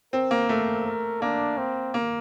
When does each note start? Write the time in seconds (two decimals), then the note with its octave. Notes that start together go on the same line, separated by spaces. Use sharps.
0.13 C4 A#4
0.31 A#3
0.49 A3 A#4
0.86 A#4
1.22 A#3 D4
1.58 C4
1.94 A#3